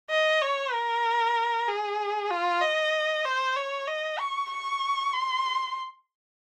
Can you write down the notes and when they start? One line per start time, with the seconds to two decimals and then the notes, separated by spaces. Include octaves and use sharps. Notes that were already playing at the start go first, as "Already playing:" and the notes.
0.10 D#5
0.42 C#5
0.73 A#4
1.68 G#4
2.30 F4
2.61 D#5
3.25 C5
3.56 C#5
3.88 D#5
4.19 C#6
4.51 C#6
5.13 C6